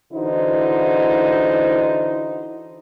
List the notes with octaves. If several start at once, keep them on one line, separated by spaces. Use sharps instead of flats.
D3 E3 D#4 E4 F#4 C5